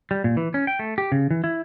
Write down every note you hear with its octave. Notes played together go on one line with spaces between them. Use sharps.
G3
A#2
E3
C#4
G5
A3
G4
C#3
E3
E4